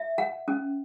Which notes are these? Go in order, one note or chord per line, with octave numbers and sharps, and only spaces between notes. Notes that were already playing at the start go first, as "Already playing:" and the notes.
Already playing: E5
F#5
C#4